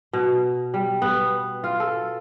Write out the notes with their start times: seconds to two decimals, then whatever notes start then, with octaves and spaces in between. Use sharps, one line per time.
0.13 B2
0.74 G3
1.02 B3
1.64 F4
1.80 A4